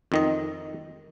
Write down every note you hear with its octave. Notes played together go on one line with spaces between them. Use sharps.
F2 D#3 D#5